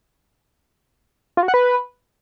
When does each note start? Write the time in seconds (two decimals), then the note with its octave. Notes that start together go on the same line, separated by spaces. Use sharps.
1.37 F4
1.43 F#4
1.48 F#5
1.54 B4